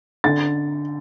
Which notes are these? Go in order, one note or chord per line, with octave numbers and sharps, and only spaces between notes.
D3 A6